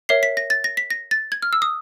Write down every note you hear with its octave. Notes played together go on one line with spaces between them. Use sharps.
A#4 C#5 E5 C7
B6
A#6
A6
A#6
B6
A#6
A6
G#6
F6
E6
D#6